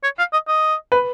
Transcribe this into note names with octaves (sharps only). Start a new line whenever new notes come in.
C#5
F5
D#5
D#5
B4